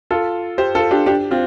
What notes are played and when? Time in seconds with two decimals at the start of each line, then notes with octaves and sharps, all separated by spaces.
0.10 F4 A4
0.58 G4 C5
0.75 F4 A4
0.91 D4 G4
1.06 D4 G4
1.31 C4 F4